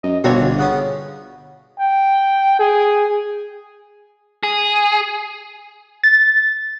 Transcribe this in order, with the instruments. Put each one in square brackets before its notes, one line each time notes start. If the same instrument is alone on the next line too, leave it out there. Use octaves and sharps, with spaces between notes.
[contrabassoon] F#2 [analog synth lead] D#5
[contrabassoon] G1 [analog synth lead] B2 [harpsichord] A#3 C4 D4 [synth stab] F#4 C#5
[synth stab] D3
[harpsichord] C#3 B3 C#4 [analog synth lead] F#5
[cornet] G5
G#4
[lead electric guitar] G#4
[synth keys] A6